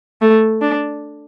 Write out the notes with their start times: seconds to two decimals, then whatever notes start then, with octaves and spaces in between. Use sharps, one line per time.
0.21 A3
0.61 D4